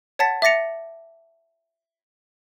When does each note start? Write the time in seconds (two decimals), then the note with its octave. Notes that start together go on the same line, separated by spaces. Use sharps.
0.19 C#5 F#5 A5 A6 B6
0.42 E5 D6 A6 A#6 C#7 F7